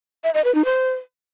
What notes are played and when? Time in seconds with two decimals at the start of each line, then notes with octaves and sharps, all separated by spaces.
0.24 E5
0.34 D#5
0.45 B4
0.55 D#4
0.65 C5